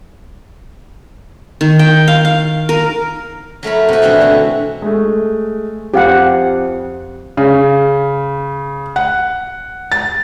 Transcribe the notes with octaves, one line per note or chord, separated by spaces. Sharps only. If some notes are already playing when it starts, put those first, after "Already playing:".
D#3
G5
F5
F5
A#4
F#3 A3 A#4 B5
C3 F#4
B2 E3 C4 D4 A4
B2 D3
G#3 A3
F2 G4 F5 F#5
C#3
F#5
A6